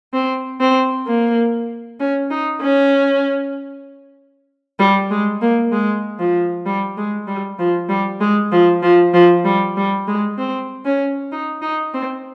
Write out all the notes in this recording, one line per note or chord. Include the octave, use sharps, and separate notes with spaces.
C4
C4
A#3
C#4
D#4
C#4
G3
G#3
A#3
G#3
F3
G3
G#3
G3
F3
G3
G#3
F3
F3
F3
G3
G3
G#3
C4
C#4
D#4
D#4
C4